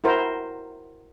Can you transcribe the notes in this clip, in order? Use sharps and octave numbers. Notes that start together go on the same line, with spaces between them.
E4 F#4 A#4 C5